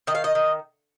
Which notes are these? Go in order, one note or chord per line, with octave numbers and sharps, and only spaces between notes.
D#3 D#5
F5
D#5
D#3